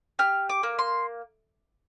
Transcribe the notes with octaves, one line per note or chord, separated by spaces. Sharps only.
G4 F6
D6
A#3
C6